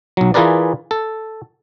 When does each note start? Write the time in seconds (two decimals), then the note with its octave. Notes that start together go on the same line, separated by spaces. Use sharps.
0.17 B1 F#3
0.34 E3 F4 G#4 A#4 B4 D5
0.91 A4